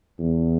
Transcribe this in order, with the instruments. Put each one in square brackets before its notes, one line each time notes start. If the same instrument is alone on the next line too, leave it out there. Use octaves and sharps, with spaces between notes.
[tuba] E2